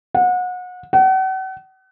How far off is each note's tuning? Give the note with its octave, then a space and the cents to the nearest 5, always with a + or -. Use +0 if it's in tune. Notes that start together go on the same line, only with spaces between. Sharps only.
F#5 -30
F#5 +40